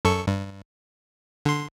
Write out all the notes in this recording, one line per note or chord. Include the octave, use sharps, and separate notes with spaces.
F#2 A4 C#6
G2
D3 C6